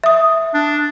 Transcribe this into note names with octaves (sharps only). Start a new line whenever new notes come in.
E5 D#6
D4